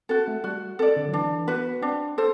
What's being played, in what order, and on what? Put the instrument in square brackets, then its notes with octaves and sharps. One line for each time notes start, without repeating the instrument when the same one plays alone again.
[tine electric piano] C4 [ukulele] F#4 A4
[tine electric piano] A3
[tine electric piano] G3 [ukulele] F#4
[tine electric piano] C4 [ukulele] A4 D5
[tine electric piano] D3
F#3
[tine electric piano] E3 [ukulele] D4
[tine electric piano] B3 [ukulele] F#4 B4
[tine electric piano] C4 [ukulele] D4
[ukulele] A4 C5